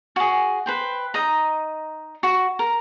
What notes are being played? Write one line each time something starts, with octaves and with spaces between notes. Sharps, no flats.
F#4 G#4
B4 C5 G5
D#4 D#5 A#5
F#4
A#4